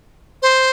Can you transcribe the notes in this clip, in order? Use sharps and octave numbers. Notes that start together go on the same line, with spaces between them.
C5